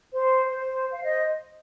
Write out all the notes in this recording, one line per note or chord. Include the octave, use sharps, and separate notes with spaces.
C5
C5
F5
C5 D#5